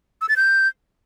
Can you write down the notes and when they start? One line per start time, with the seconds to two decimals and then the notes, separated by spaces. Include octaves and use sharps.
0.21 E6
0.29 A6
0.36 G6